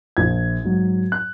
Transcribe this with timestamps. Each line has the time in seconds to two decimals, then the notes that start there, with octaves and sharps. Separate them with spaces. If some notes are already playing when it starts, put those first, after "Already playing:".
0.17 A#1 G#6
0.64 G#2 F#3
1.12 F#6